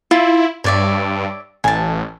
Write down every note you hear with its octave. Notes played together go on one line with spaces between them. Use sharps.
E4 F4
G2 C#5 D5 E5
A1 G#5 A5